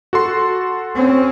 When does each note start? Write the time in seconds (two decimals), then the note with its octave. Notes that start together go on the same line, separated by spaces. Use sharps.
0.13 F#4 A4 C6
0.95 C4 C#4